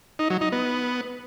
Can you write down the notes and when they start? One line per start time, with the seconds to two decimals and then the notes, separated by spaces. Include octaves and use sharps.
0.19 D#4
0.30 F#3
0.41 D#4
0.52 B3